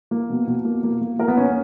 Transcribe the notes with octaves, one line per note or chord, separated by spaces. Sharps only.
A#3
B2
B2
A#3
A#3
A#3
A#3 A#4
B3
B2 C#4